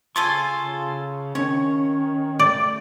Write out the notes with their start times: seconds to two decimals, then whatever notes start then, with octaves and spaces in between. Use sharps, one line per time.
0.16 C#3 F4 A4 G#5 C6 C#6
0.62 C#3
1.35 D#3 C#4 C#5
2.39 A3 D5